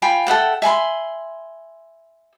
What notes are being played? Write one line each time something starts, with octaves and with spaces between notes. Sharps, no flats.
F4 G5 G#5 B5
A4 E5 F#5 G5
E5 G#5 B5 C6